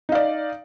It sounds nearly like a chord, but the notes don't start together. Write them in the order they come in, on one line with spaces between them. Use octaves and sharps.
D#4 F5 D5